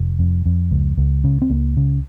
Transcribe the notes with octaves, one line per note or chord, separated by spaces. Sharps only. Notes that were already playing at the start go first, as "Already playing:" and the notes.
Already playing: F1
F2
F2
C#2
C#2
C#3
C4
C#2 A#3
C#3